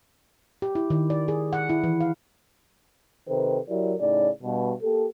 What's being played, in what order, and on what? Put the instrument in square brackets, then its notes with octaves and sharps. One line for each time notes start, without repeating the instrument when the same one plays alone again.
[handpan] G4
E4
D#3
D5
G#4
F#5
E4
E3
F5
[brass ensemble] C3 D#3 A4 B4 C5
F#3 E4 G4 A#4 D5
A2 C#3 D#4 D5
G2 B2
A#3 G4 A4